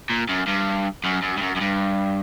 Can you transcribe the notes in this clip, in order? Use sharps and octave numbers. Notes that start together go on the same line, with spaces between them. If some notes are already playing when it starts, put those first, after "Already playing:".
A#2
F#2
G2
F#2
F#2
G2
F#2
F#2
G2